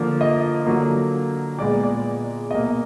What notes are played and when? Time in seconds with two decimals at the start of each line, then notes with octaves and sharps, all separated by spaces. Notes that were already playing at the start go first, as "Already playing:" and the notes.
Already playing: D3 F3 A#3
0.21 D#5
0.66 D3 F#3 A#3
1.58 A#2 G#3 B3 D5
1.84 D5
2.51 B2 A#3 D#5